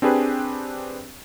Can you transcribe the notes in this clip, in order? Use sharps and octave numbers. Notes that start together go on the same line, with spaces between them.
C4 D4 G4 G#4 B4